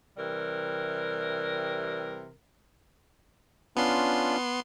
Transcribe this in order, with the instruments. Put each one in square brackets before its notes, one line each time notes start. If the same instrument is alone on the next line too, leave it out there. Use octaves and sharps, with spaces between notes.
[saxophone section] C3 E3 G3 A#4
[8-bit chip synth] B3 C6 [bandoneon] C#4 D4 F4